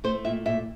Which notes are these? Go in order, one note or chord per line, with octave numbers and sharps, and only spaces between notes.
A3 C5
A#2 E5
A#2 E5